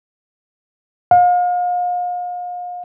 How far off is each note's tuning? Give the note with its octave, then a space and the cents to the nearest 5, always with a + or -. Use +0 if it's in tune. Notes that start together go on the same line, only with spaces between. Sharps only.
F5 +40